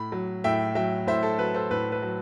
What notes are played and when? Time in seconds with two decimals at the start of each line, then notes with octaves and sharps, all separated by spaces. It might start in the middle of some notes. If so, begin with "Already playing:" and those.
Already playing: A2 B5
0.12 F#3
0.44 A2 E5 G5
0.75 F#3 E5 G5
1.07 A2 C5 E5
1.23 A4
1.39 F#3 B4
1.55 A4 C5
1.70 A2 B4
1.92 B4
2.02 F#3